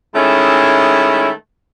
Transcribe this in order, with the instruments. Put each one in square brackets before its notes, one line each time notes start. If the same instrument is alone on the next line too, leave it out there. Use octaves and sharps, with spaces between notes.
[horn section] D#3 G#3 A3 C#4 E4